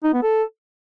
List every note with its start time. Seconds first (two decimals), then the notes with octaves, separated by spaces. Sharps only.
0.04 D#4
0.13 B3
0.23 A4